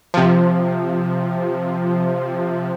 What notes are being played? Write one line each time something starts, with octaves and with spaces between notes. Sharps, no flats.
C3 F3